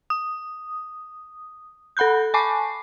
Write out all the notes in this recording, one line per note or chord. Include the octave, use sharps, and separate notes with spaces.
D#6
A4 F#5 B5 F#6 G6
G#5 A5 B5 C#6 D6 C7